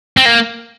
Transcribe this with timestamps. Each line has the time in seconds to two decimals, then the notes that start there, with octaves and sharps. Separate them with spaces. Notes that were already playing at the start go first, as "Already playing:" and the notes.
0.17 C4
0.25 A#3